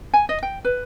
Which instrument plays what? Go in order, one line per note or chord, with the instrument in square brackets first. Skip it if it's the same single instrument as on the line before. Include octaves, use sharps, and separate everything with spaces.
[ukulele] G#5
D#5
G5
B4